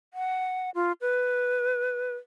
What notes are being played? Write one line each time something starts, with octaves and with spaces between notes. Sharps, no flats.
F#5
F4
B4